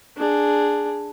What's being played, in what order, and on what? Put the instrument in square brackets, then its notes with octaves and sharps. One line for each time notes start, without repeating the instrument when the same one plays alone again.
[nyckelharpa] D4 G#4